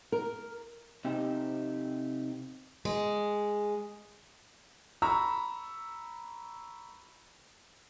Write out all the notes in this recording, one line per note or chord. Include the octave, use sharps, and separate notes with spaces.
A#4
C3 C4 D#4 G4
G#3
A#5 B5 C#6 E6